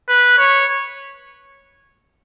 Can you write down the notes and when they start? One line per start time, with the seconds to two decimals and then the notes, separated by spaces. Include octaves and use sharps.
0.09 B4
0.38 C#5